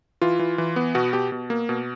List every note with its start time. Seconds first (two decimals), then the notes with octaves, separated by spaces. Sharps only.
0.21 E3 F4
0.39 E3
0.58 E3
0.76 B3
0.95 B2 F#4
1.13 B2 G4
1.32 B2
1.50 A#3
1.69 B2